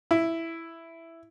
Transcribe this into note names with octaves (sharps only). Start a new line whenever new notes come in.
E4